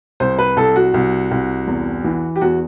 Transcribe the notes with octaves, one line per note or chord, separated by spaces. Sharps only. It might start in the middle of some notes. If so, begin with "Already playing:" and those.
C2 C5
B4
C2 A4
F#4
C2
C2
E2
E3
G4
E2 F#4